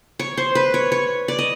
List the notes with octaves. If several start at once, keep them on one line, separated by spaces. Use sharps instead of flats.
C#5
C5
B4
C#5
C#5
D5
D#5